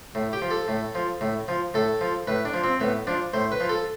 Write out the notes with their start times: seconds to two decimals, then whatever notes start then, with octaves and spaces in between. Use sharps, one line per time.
0.15 A2
0.33 G4
0.42 F3
0.50 A4
0.68 A2
0.95 F3
1.21 A2
1.48 F3
1.74 A2 A4
2.01 F3
2.27 A2 B4
2.45 D4
2.54 F3
2.64 C4
2.80 A2 B3
3.07 F3 D4
3.33 A2 C5
3.52 B4
3.60 F3
3.69 A4